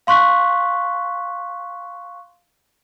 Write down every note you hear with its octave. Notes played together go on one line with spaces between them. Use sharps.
F5 C6 C#6 F#6 B6